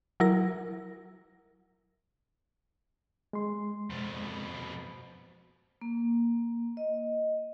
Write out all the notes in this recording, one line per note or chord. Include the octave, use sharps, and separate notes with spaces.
F#3 E4 A#4 A#6
G#3 C6
F2 B2
A#3
D#5